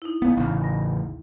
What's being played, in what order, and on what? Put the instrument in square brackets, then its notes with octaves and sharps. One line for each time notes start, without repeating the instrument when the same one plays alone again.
[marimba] D#4 E4
[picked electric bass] B1 B3 [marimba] F5
[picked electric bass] A1 C#3
[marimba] D#2 A#6